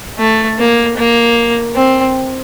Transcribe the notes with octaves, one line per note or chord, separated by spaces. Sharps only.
A3
A#3
A#3
C4